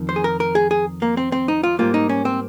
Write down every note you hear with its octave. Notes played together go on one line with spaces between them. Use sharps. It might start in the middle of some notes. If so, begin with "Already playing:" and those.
Already playing: F2 D#3
C5
G#4
A#4
A#4
G#4
G#4
A#3
C4
C4
D#4
F4
G#2 G3 A#3 F4
D#4
C#4
C4